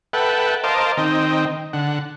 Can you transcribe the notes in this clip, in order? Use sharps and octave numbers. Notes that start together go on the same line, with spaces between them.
A4 B4 E5 F#5 G5
A#4 C5 D#5 F5 A5 D6
D#3 C4 D#5 G5
D3 F#5